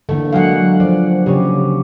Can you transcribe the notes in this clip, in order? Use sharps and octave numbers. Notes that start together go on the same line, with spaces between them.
D3 E3 A3 A#3
F#3 G#3 A#3 F5 F#5
F3 D5
C#3 C#4 G4